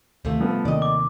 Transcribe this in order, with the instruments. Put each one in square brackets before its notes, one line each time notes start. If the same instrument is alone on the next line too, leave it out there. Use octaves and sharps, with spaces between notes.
[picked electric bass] D2 D#3 [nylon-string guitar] C3 A3 F4
[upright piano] F3 B3 A4 [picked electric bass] G3
[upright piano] D#2 [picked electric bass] C3 D#3 C4 [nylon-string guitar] D5 D#5
[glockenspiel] D6